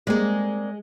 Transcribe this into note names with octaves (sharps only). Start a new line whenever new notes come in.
G#3 A#3 C4 G#4 D5